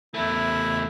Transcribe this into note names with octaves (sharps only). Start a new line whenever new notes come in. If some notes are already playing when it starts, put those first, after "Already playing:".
E2 A3 E4